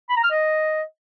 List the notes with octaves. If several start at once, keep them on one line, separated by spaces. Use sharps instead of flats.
B5
A#5
F6
D#5